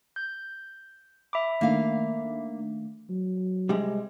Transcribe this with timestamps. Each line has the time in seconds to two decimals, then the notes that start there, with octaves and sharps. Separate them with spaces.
0.16 G6
1.33 E5 B5 D6
1.61 D#3 A3 A#3 D4 F5
3.09 F#3
3.69 C3 G3 G#3